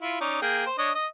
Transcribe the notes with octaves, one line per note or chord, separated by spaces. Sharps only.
E4 F4
C#4 D#4 D5
A#3 G#4 G5
C5
D4 C#5 D#5
D#5